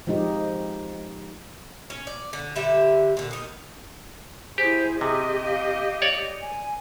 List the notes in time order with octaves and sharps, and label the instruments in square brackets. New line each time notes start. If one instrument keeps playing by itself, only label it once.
[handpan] F3 G#3 D#4 G4
[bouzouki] C#4
D5
D3
D3 G3 G4 E5
A#2 D3
D#3 D#4
[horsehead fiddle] E4 G#4 [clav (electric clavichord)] G4 [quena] C5
[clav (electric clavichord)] C3 [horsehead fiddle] G4 D#5 [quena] G#4
[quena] F5
[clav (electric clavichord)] C#5 D5
[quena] G#5